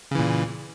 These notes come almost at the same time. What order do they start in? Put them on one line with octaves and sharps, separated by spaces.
C#3 E3 A#2